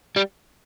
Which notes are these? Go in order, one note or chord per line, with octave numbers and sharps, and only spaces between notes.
G3